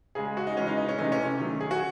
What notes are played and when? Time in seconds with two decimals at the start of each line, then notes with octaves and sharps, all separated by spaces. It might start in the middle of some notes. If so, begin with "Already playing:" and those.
0.15 C#3 G#3 G#4
0.37 F#4
0.47 D#4
0.57 C#3 E3 G#3 C#4
0.67 D#4
0.77 D#4
0.89 C#4
0.98 C3 E3 A3 D#4
1.12 C#4
1.39 D#3 F#3 A3
1.61 G#4
1.71 F#4